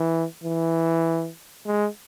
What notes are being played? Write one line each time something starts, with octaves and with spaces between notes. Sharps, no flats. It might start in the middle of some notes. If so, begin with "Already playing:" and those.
Already playing: E3
E3
G#3